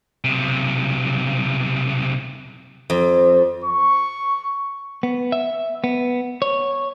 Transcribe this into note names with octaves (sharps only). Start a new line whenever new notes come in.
B1 C3
F2
C#6
B3
E5
B3
C#5